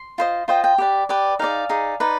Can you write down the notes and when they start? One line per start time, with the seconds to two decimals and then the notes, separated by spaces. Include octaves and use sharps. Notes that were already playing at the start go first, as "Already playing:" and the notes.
Already playing: C6
0.18 F4 C5 D#5
0.48 F4 C5 D#5 G5
0.64 G5
0.78 G4 B4 D5
1.09 G4 B4 D5
1.39 D#4 G#4 D5 F5
1.69 D#4 G#4 D5
2.00 D#4 B4 D5